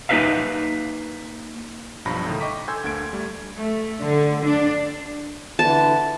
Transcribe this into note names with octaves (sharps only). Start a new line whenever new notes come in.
A#3 D#4 E4 B4 E5 F5
B1 G2 F3 A#5 B5 A#6
A2 D3 D#3
D#5 G5 C#6 D6 B6
A4 G#5 C6 E6 G6 G#6
D2 D3 A#3 G#6 D7
G3 A3
A3
D3
D4
D3 E3 A5